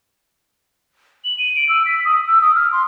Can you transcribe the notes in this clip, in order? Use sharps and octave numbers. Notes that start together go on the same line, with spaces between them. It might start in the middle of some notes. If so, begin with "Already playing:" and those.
F#7
D#7
D7
E6
B6
D#6
E6
D#6
F6
C6